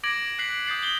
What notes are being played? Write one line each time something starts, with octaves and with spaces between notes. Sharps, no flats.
D6 G#6 A#6 D7 F#7
F#6 B6 C7 D7 F#7
D#6 G6 A6 C7 F#7
G6 G7